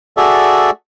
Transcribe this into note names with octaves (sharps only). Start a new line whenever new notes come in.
F#4 G#4 A4 D5 E5